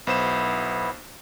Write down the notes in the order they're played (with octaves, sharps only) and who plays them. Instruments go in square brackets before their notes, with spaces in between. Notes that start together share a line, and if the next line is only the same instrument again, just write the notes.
[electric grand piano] B1 C5 E7 [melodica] B3 E4